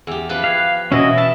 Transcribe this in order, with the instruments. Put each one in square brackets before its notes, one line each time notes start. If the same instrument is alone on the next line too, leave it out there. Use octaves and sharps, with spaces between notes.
[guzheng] E2 G4
F3 G4 B4
[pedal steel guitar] F5 [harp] F#6 G#6 C7
[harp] B2 A6 [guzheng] E3 E4 [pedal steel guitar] C#4 F#4 D#5
[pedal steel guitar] E5 [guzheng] A5